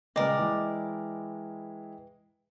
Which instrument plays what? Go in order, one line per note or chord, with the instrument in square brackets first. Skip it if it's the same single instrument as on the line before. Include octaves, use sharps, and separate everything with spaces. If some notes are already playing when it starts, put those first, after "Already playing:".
[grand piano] A#2 C#3 G#3 [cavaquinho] A#4 D5 [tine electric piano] B4 G5 [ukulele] D#5
[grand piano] E3 G#3 E4